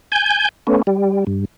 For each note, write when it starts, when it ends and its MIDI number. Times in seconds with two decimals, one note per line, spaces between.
0.12 0.49 80
0.12 0.49 91
0.67 0.82 57
0.67 0.82 59
0.67 0.82 61
0.87 1.24 55
1.27 1.45 43